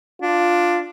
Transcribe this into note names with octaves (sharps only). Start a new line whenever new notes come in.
D4 F4